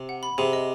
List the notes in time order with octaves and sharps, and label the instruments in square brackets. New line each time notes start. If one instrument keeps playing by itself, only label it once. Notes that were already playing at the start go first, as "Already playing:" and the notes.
Already playing: [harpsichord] C3
[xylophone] F#5
B5
[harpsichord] C3 [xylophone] G#4
[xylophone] D#5